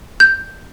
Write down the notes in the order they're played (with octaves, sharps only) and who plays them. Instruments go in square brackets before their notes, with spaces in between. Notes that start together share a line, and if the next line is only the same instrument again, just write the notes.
[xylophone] G6